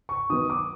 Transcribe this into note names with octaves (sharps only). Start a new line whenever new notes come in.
C#6
D#3 F#3 B3 D#6
D6